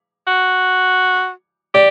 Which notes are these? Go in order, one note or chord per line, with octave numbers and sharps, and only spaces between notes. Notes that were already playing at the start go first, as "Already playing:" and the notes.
F#4
G4 D5